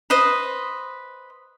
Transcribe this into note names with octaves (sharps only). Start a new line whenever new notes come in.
B4 C5 D#5 C6